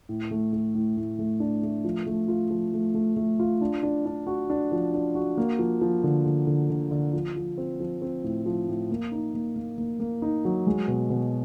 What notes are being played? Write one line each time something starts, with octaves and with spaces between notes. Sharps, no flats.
A2
A3
A3
A2
A2
A3
D4
A3
F3
A3
F4
F3
A3
A3
A3
F4
D4
D4
D4
F#4
D4
F3
D4
F#4
A#3
F3
F3
D3
D3
D3
D3
D3
F3
F3
C4
F3
C4
A2
F3
A2
A#3
D#4
A#3
A#3
A#3
A#3
D#4
F#3
G#3
B2
B2